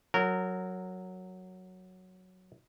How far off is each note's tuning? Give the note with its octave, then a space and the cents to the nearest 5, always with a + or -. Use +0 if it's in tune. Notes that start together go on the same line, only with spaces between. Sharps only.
F#3 +0 A#4 -20